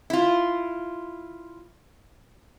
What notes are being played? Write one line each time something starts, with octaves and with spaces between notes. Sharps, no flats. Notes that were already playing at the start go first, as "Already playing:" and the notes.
E4 F4